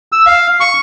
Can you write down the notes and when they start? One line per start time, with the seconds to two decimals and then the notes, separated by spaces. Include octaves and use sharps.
0.12 E6
0.26 F5
0.60 C#6